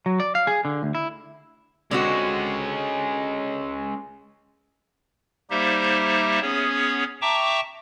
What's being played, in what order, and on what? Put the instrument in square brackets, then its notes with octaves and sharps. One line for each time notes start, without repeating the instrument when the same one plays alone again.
[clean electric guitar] F#3
D5
F5
G#4
D3
D2
E4
[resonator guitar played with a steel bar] D3 C4 F#4 [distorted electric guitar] G#3 C#4
[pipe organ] G3 A#3 D#4 G4 C5 E5
B3 C#4 G#4 C#5
E5 G5 A5 A#5 C#6 D6